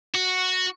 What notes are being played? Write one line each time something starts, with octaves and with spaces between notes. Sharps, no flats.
F#4